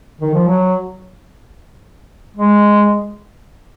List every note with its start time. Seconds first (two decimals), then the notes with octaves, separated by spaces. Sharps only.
0.21 D#3
0.34 F3
0.47 F#3
2.36 G#3